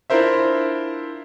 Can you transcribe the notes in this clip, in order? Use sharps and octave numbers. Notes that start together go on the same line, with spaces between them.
D4 E4 F4 A#4 C5 E5